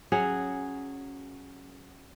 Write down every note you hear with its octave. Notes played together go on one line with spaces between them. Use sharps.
F#3 C#4 G#4